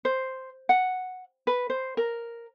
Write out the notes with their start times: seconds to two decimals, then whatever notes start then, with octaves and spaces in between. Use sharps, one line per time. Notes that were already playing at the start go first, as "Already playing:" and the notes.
0.05 C5
0.69 F#5
1.47 B4
1.70 C5
1.97 A#4